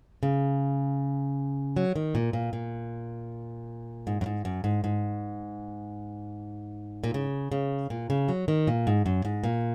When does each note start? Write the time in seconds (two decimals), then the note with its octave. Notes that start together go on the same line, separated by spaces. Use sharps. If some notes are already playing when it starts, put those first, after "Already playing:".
0.23 C#3
1.76 F#3
1.96 D#3
2.15 A#2
2.33 A#2
2.53 A#2
4.07 G#2
4.21 F#2
4.26 G#2
4.45 F#2
4.64 G#2
4.84 G#2
7.04 A#2
7.14 C#3
7.51 C#3
7.90 A#2
8.10 C#3
8.28 F#3
8.48 D#3
8.67 A#2
8.87 G#2
9.06 F#2
9.25 G#2
9.44 A#2